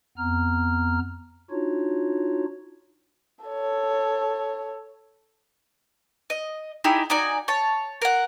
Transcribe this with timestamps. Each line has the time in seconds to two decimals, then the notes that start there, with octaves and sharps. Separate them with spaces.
0.18 F2 B3 A#5 F6
1.51 D4 D#4 F4 F#4 C#5
3.45 A4 C#5
6.30 D#5
6.84 D#4 E4 G4 G#4
7.10 D#4 F#4 D5 G#5
7.48 C#5 A5
8.02 A#4 F#5